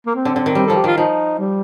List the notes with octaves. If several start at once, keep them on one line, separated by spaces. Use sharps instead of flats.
A#3
C4
D3
D3
D#3
G3 C4
F3 A4
G4
D#3 F4
F3 D#4
G3